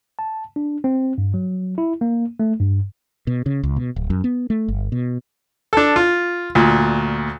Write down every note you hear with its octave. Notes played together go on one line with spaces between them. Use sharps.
A5
D4
C4
G2
F#3
E4
A#3
A3
G2
B2
C#3
C#2
B2
D1
F#2
B3
A3
G1
B2
D4 A4
F4
D2 A#2